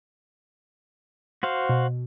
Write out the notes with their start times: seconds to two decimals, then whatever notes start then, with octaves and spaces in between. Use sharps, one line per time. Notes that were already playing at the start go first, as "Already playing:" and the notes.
1.43 F#4 C5 F5
1.69 B2